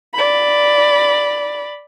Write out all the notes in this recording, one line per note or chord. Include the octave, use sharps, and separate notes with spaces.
D5 B5